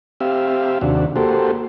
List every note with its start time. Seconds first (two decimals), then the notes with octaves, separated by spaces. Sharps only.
0.20 C4 G4 E5 F5
0.81 D#2 C3 D4 F#4
1.16 A#3 F#4 G4 A4 C5